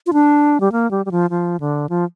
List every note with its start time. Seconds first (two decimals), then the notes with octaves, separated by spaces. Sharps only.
0.06 F4
0.13 D4
0.61 G3
0.72 A#3
0.91 G3
1.06 G3
1.11 F3
1.30 F3
1.60 D3
1.89 F3